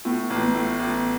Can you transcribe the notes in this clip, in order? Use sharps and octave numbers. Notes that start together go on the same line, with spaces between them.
A2 B3
A1 A3
B3
A2
A1